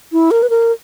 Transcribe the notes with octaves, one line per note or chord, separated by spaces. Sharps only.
E4
A#4
B4
A#4